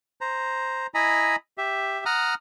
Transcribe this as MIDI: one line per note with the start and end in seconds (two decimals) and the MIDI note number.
0.21 0.87 72
0.21 0.87 82
0.94 1.36 64
0.94 1.36 75
0.94 1.36 80
0.94 1.36 82
0.94 1.36 83
1.58 2.04 67
1.58 2.04 76
2.06 2.35 78
2.06 2.35 82
2.06 2.35 87
2.06 2.35 89